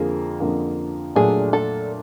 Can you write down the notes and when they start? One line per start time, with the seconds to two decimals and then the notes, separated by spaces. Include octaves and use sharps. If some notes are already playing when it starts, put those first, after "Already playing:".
Already playing: F2 D3 F3 A#3 G#4
0.40 F2 D3 F3 A#3
1.16 A#2 F#3 A3 D4 G#4
1.53 A4